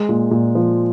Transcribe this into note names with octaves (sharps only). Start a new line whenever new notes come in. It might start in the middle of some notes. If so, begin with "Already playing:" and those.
Already playing: G#3
A#2
A#2
F3